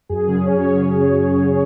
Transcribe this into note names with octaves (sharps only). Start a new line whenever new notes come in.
F#2 G#4
C#3 F#3 C#4
F#2 C#5
C#3 F#3 C#4